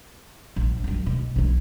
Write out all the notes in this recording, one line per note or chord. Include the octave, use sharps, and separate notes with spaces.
A#1
A#1 F#2
B2
B1 E3